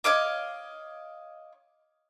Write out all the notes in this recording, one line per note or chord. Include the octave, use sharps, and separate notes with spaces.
C#5 D#5 F5 D6